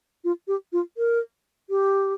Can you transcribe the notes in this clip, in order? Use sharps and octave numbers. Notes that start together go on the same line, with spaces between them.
F4
G4
F4
A#4
G4